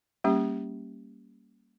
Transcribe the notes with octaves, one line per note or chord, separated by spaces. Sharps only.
G3 A#3 C#4 G4